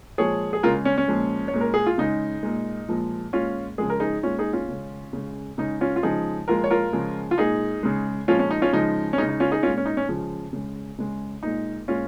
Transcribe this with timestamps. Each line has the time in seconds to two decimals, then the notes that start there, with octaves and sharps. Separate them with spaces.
0.18 A#2 F3 G#3 G#4 C#5
0.53 G#4
0.63 C#3 G#3 F4 A#4
0.85 C#4
0.98 C#4
1.08 A#2 F3 G#3
1.48 C#5
1.53 A#2 G#3
1.61 A#4
1.74 G#4
1.86 F4
1.98 C#3 G#3 D#4
2.43 A#2 G#3
2.89 A#2 F3 G#3
3.33 A#2 G#3 C#4 F4
3.78 C#3 F3 G#3 G#4
3.90 A#4
4.00 D#4 G#4
4.23 A#2 G#3 C#4 F4
4.39 D#4 G#4
4.53 C#4 F4
4.69 C#3 G#3
5.13 C#3 G#3
5.58 C#3 G#3 D#4
5.81 C#4 F4
5.96 F4
6.03 C#3 F3 G#3 D#4 G#4
6.48 A#2 F3 G#3 F4 A#4
6.64 C#5
6.70 F4 A#4
6.93 C#3 F3 G#3
7.31 F4
7.38 A#2 G#3 D#4 G#4
7.83 C#3 G#3
8.28 A#2 F3 G#3 C#4 F4
8.39 C#4
8.51 D#4
8.62 C#4 F4
8.73 C#3 F3 G#3 D#4
9.13 C#4
9.18 G#3 D#4
9.22 C#3
9.29 D#4
9.40 C#4 F4
9.52 D#4 G#4
9.63 A#2 C#4 F4
9.67 G#3
9.77 C#4
9.86 D#4
9.97 C#4
10.09 C#3 F3 G#3
10.53 C#3 G#3
10.98 C#3 G#3
11.43 A#2 G#3 D#4
11.88 A#2 G#3 C#4 F4